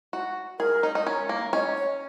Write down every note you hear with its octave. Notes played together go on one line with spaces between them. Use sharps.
F#4
G#4 A#4
D#4
D#4
C#4
A#3
C#4 D#5
C#5